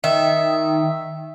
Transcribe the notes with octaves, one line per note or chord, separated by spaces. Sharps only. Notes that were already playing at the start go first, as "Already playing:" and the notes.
D#3 E5